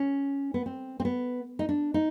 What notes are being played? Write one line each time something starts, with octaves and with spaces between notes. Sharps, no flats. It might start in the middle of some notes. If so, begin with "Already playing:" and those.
Already playing: C#4
B3
C4
C4
B3
D#4
D4
D#4